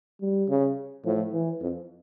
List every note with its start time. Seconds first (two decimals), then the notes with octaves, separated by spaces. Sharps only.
0.21 G3
0.49 C#3
1.06 A2 F3
1.33 E3
1.61 F2